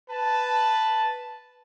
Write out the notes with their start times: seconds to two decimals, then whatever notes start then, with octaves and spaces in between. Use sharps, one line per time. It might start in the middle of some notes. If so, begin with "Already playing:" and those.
0.10 B4 A5